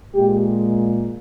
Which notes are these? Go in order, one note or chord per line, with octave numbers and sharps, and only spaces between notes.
A#2 G#3 G4